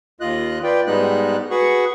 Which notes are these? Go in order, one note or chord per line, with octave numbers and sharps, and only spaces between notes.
D#2 F4 D#5 F#6
F4 B4 D5 G5
G#2 G3 G#3 B3 D#4 F#6
F#4 G#4 B4 F#5 C#6